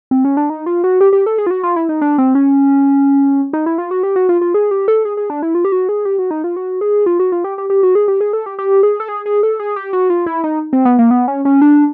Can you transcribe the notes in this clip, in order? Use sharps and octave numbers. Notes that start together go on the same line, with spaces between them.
C4
C#4
D4
D#4
F4
F#4
G4
G4
A4
G#4
F4
F#4
F4
E4
D#4
D4
C4
C#4
D#4
E4
F4
F#4
G4
F#4
F4
F4
G#4
G4
A4
G#4
G#4
D4
E4
F4
G4
F#4
G#4
G4
F#4
D#4
F4
F#4
G#4
F4
F#4
F4
G4
G4
G4
F#4
G#4
G4
G#4
A4
G4
G4
G#4
A4
G#4
G#4
A4
G#4
G4
F#4
F4
E4
D#4
C4
B3
A#3
B3
C#4
C#4
D4